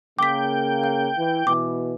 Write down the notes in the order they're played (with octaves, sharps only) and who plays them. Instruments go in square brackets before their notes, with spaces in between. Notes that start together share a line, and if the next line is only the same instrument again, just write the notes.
[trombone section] C#3 A#3 [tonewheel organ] G5 [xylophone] D6 B6
[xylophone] F5
[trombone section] E3
[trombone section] B2 E3 [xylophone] D6